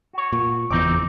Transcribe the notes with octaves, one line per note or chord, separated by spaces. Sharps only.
F#4 C#5
A#2
F#1 E2 C4 D#4 D6